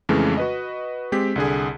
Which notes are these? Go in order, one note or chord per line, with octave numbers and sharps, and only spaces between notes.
F2 C#3 E3 G#3 A3 C#4
F#4 B4 D#5
G#3 C4 G4 B6
C2 D3 G#4